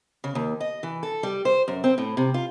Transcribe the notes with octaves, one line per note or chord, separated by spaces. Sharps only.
C#3
D#2
D#5
E3
A4
G3
C5
F#2
C4
A2
C3
F4